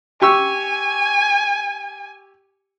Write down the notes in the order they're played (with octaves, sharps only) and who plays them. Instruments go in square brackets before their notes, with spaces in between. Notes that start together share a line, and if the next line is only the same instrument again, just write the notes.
[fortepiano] G4 C#6 E6 [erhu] G#5